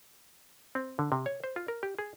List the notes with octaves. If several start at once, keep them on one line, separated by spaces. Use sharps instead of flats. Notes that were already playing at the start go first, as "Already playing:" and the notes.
C4
D3
C3
C#5
C5
F4
A#4
G4
G#4